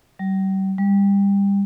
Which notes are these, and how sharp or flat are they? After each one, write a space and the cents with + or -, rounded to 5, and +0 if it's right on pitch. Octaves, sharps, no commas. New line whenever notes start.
G3 -35
G3 +25